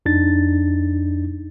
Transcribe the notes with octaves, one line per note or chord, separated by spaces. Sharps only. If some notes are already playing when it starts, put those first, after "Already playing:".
F2 D4 D#4 A6